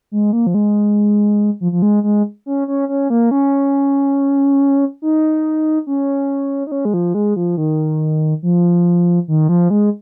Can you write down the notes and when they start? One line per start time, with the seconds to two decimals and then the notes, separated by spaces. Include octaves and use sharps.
0.12 G#3
0.33 A#3
0.47 F3
0.54 G#3
1.61 F3
1.72 F3
1.82 G#3
2.03 G#3
2.46 C#4
2.68 C#4
2.89 C#4
3.10 A#3
3.31 C#4
5.02 D#4
5.87 C#4
6.67 D#4
6.72 C#4
6.85 G#3
6.94 F3
7.14 G#3
7.36 F3
7.57 D#3
8.43 F3
9.28 D#3
9.49 F3
9.70 G#3